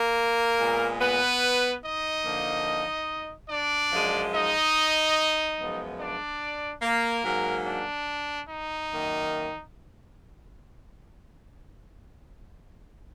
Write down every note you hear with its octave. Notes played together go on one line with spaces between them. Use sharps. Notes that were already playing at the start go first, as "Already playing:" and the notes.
Already playing: A#3 A#4
A#2 G#3 B3
B3 B4
D#4 D#5
D3 F3 A#3
D4 D5
F#2 F3 G#3
D#4 D#5
F#2 F3 G#3 B3
D4 D5
A#3 A#4
G#2 F#3 A#3
D4
D#4
F#2 D#3 A#3